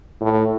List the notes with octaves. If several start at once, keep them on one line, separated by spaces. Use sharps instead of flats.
A2